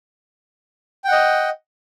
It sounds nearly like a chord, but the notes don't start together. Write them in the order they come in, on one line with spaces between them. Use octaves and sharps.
G5 F#5 D#5